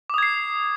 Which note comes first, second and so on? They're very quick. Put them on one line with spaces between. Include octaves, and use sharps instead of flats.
D6 D#6 G#6 C7